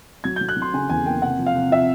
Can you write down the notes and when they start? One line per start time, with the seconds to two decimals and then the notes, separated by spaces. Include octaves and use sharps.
0.24 F#3 G#6
0.36 F#3 G6
0.49 F#6
0.57 F#3
0.62 C6
0.74 C#3 G#5
0.90 E2 G#5
1.06 A#3 G5
1.22 C3 F#5
1.39 F3
1.46 F5
1.56 C3
1.71 F3 E5